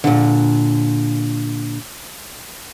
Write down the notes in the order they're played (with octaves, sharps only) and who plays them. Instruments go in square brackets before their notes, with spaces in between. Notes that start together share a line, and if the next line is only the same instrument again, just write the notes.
[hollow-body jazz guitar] A#2 D3